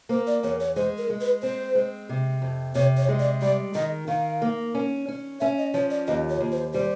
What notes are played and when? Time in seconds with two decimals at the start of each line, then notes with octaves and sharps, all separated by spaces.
0.09 A#3 C5
0.27 D5
0.43 E2 C#5
0.60 C#5
0.76 G#3 C5
0.98 A#4
1.10 G#3
1.21 B4
1.42 C4 C5
1.75 G#3
2.09 C3
2.42 F2
2.75 C3 C#5
2.97 C#5
3.09 G#3
3.19 D5
3.42 G3 D5
3.75 D#3 D#5
4.08 D#3 F5
4.42 A#3
4.75 C#4
5.08 C#4
5.40 C#4 E5
5.58 D#5
5.74 F3 C#5
5.91 D5
6.07 D#2 D#5
6.30 C#5
6.40 D#2
6.52 C5
6.74 G3 C5